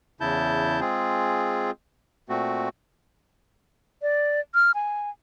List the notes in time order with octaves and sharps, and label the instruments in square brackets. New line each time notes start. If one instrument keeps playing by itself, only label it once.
[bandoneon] E2 C#3 E4 A5 G6
G#3 C4 F4 G#4
A#2 A3 C4 F#4
[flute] D5
F6
G#5